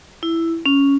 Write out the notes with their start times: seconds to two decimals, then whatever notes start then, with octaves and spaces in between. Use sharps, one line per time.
0.23 E4
0.66 C#4